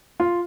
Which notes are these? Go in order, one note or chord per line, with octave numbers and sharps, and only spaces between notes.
F4